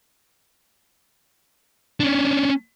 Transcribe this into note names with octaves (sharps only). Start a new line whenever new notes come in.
C#4 D4